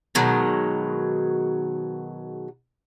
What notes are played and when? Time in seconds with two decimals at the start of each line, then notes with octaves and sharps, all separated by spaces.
0.15 B2 D#3 F#3 G#3